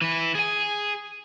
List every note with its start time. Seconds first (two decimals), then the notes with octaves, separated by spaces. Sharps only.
0.02 E3 E4
0.35 G#4 G#5